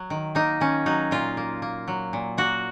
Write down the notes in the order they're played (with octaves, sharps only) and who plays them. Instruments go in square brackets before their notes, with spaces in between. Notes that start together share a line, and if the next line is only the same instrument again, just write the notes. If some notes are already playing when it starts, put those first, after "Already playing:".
Already playing: [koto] F#3
D#3
A#3 D#4
D#3 C#4
F#3 D#4
A#2 F4
A#3
A#3
F#3
A#2
A#3 F#4